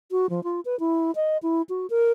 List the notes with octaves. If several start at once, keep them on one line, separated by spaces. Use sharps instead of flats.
F#4
F3
F4
B4
E4
D#5
E4
F#4
A#4